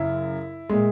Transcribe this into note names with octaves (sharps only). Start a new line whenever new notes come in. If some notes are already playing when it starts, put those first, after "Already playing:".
Already playing: F#2 C#3 E4
A#2 G#3